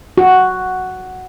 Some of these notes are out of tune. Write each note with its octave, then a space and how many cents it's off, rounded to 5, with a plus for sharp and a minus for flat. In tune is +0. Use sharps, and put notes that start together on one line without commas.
F#4 +0